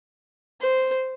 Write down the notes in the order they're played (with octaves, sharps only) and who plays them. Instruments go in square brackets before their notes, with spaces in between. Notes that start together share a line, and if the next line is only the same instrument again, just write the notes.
[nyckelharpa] C5